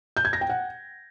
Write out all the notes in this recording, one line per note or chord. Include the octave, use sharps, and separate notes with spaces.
G6
G#6
A#6
G5
F#5